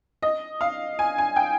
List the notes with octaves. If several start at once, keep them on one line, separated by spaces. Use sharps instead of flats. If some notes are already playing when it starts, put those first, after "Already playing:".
D#5
F5
G#5
G#5
G5